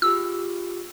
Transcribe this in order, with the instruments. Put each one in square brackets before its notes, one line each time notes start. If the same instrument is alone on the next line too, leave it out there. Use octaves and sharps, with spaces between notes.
[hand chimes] F4 G4 G#4 [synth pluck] E6